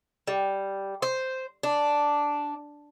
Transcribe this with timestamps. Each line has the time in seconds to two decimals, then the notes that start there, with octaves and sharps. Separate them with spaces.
0.27 G3
1.02 C5
1.63 D4